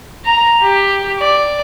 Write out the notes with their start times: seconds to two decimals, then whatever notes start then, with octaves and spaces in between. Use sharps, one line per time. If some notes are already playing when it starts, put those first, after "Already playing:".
0.25 A#5
0.62 G4
1.19 D5